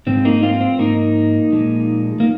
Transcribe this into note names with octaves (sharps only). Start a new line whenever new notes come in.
G#2 F3 G#3 C4
A#3 D#4
C4 F4
C4
G#2 F3 A#3 D#4
A#2 F3 G#3
A#3